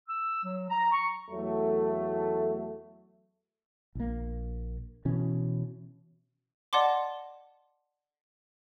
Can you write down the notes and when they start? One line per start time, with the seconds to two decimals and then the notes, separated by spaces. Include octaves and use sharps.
0.09 E6
0.43 F#3
0.69 A#5
0.92 C#6
1.31 E2 F#3 A3
3.95 A#1 A#3
5.05 B2 E3 C#4
6.73 D5 D#5 F#5 A5 C6 D6